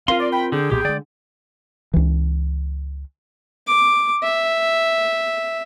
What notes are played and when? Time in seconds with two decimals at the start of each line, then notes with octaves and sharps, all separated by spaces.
0.08 C4 F4 A#4 F5 C6
0.20 D5
0.32 G5 B5
0.52 D3 G#4 G5
0.71 B1 A#2 B3 G4
0.85 D3 G#3 D5
1.94 C#2 E3
3.67 D6
4.23 E5